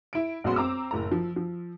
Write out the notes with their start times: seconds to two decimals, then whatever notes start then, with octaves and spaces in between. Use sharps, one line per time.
0.13 E4 D7
0.44 A#1 F#2 G#3 B3 F#4 C6
0.56 C4 A#5 D6 E6
0.91 F#1 A2 A#5
1.12 F3
1.36 F3